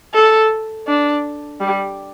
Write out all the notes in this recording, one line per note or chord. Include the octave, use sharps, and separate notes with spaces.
A4
D4
G3